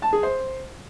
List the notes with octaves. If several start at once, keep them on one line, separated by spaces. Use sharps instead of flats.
A5
G#4
C5